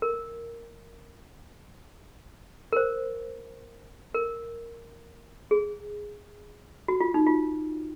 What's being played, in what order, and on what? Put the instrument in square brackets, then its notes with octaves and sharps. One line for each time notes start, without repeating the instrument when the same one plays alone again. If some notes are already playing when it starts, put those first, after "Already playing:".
[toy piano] A#4
A#4
C5
A#4
G#4
F#4
F4
D#4
F4